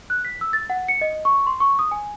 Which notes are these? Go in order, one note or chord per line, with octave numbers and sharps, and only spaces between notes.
F#6
B6
E6
A6
F#5
C#7
D#5
C#6
C6
C#6
D#6
G#5